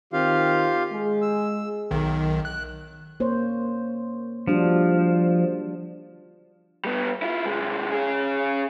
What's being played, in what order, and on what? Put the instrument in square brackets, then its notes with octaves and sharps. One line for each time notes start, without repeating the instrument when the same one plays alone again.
[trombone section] D#3 C4 [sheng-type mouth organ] F4 G4 F5
[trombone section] G#3 G#4
[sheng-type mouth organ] E6
[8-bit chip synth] B1 D#3
F#6
[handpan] A#3 C5 C#5
[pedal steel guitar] F3 [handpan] G3 D4 F#4
[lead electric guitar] G3 B3
E4 F4
C3 G#3
C#4 G#4